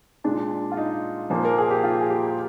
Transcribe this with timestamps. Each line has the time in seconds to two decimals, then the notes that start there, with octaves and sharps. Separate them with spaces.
0.24 A#2 G#3 D4
0.72 F4
0.77 D#4
1.30 A#2 F3 A#3
1.45 A#4
1.58 G#4
1.70 G4
1.83 F4
2.01 G#4
2.10 G4
2.26 G4